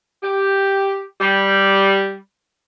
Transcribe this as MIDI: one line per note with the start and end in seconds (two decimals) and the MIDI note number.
0.23 1.02 67
1.21 2.16 55